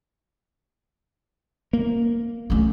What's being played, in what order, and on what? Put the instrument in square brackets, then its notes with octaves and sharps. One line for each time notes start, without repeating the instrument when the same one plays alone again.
[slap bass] A#3
[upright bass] A3 C#4